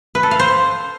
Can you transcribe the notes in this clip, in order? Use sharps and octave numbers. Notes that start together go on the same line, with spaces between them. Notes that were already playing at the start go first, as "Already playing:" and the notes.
B4
A4
F5
C5